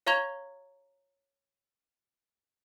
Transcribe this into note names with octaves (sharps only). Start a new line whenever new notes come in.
C#5 F5 A#5 C#6 G#6 F7